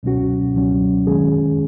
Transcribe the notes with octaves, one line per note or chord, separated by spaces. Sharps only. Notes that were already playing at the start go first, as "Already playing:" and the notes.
C#2 B2 F#3 C#4 F#4
C#2 B2 F#3 C#4 F#4
F#2 D#3 G#3 C#4 G#4